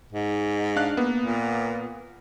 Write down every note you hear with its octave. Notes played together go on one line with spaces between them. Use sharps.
G#2
D4 F5 F#6
A#3 B3
A#2